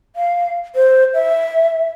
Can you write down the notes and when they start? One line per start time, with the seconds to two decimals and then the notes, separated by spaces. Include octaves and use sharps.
0.16 F5
0.75 C5
1.14 E5